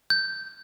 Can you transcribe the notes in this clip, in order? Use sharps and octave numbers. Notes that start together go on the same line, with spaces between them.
G6